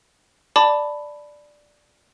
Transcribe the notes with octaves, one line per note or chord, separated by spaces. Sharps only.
D5 A5 B5 D6